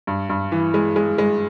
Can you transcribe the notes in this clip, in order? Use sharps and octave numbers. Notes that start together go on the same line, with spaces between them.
G2
G2
E3
G#3
G#3
G#3